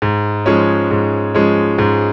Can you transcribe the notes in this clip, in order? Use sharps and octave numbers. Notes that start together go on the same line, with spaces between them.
G#2
F3 G#3 C#4
G#2
F3 G#3 C#4
G#2